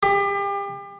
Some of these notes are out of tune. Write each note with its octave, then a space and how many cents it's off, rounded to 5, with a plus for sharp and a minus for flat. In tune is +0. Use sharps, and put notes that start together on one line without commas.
G4 +35